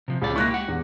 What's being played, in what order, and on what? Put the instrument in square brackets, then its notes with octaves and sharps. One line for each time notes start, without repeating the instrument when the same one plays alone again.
[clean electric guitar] C3 F3
[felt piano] C#2 [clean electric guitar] B2 C#4 D5
[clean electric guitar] G#3 A#3 E4 [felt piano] C#6 F#6 A#6
[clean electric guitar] G4 F#5
[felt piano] E2